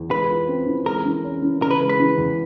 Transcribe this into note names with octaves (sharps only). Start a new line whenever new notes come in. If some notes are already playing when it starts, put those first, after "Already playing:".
Already playing: E2
G#3 B4
F4
C4
E3
G#3 A#4
E3
C#4
E3
C#3 A#4
B4
G#3
B4
E3
E2